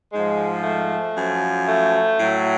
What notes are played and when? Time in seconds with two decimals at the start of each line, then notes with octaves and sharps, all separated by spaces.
0.12 G#2 F3 G#3
0.64 A3
1.15 F#2 F3
1.67 A3
2.18 A2 F#3